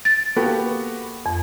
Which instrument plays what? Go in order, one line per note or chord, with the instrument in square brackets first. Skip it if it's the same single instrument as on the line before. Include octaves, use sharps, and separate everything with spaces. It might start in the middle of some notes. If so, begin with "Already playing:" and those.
[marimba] A6
[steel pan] A#3 A4 [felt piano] B3 F#4 G4
[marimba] F2